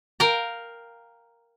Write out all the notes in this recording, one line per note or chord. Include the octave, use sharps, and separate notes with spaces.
A#4 F5 G5 A#5